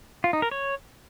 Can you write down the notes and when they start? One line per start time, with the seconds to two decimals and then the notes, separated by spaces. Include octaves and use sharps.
0.24 F4
0.33 D#4
0.42 A#4
0.51 C#5